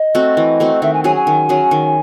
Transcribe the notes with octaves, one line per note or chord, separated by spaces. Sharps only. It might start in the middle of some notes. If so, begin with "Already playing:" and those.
Already playing: D#5
A3 C4 F#4
E3
A3 C4 F#4
D#3 E5
G#5
F#3 C#4 G#4 G#5
G#5
D#3
F#3 C#4 G#4
D#3